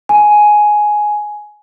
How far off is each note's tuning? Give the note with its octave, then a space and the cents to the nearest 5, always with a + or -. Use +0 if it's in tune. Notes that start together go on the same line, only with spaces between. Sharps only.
G#5 +10